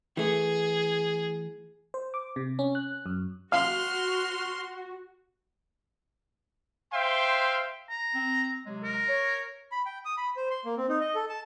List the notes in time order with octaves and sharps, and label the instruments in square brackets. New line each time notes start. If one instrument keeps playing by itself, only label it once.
[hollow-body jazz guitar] E3 A3 [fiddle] G#4
[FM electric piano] C5
D6
C3
C#4
F#6
F#2
[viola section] F#4 [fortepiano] F5 [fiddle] C6 [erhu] F6
[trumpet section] C5 E5 F5 G5 C6
[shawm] A#5
[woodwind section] C4
C3 F#3 G#3
[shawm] A#4
[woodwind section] C#5
[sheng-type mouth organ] B5
G5
D#6
B5
C5
C6
A#3
C4
D#4
D#5
A4
A5